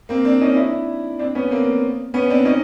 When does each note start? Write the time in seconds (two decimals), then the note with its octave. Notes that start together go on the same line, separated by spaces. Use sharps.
0.09 A#3 C4
0.25 C4 D4
0.41 C#4 D#4
0.56 D4 E4
1.19 C4 D4
1.35 B3 C#4
1.51 A#3 C4
2.14 B3 C#4
2.30 C4 D4
2.45 C#4 D#4